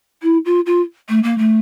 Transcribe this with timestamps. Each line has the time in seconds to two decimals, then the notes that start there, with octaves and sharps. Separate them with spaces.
0.23 E4
0.45 F4
0.66 F4
1.09 A3
1.23 A#3
1.38 A3